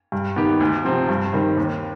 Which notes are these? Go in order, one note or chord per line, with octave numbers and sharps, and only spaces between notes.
G2
D#3 B3 D#4 G4
D2
C3 F3 C4
G2
D#3 G3 C4
D#2